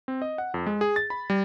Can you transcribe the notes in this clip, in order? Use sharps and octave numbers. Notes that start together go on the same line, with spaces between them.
C4
D#5
F#5
F2
G#3
G#4
A6
B5
G3